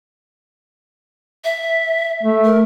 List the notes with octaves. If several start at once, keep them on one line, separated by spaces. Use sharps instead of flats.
E5
A3
A#4